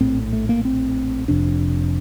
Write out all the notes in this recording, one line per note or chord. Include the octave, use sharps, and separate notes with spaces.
A#1 A2 C4
A3
A#3
C4
F1 F2 C3 D4